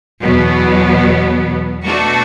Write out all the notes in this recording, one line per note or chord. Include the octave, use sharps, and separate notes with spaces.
E2 B2 F#3 B3
B2 A3 D4 F#4